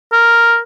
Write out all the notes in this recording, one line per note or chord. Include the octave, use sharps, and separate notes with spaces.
A#4